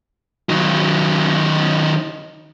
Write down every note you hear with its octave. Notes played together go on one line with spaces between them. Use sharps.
D#3 F#3